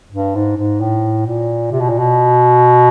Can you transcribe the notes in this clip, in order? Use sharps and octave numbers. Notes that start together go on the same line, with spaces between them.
G2
G#2
G#2
A2
A#2
C3
B2
A#2
B2